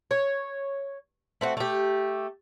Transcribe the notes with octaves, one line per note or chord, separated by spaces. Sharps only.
C#5
A3 C4 F#4
A3 G4